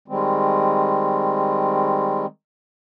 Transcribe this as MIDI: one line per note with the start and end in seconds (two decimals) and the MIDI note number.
0.08 2.26 51
0.08 2.26 55
0.08 2.26 56
0.08 2.26 60